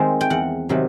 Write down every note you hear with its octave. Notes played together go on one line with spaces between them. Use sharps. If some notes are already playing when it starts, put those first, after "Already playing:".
Already playing: D#3 G#3 C4
G5
E2 F#5
C3 D#3 F#3